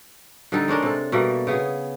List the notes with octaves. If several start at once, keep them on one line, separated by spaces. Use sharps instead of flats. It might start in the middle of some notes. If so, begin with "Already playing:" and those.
D3 G3 D#4 A4
G#3 C#4 D4 A#4
C3 A4
B2 G3 A3 A#3
C#3 B3 G#4